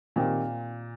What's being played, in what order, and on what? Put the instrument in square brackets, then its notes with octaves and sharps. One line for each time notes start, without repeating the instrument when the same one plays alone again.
[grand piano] A#2 [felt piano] D#3 C4 G4